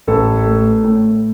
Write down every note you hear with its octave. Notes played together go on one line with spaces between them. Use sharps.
A1 A4
A3
A2